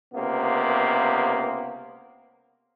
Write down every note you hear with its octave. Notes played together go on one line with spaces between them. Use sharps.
C#2 C3 A#3 B3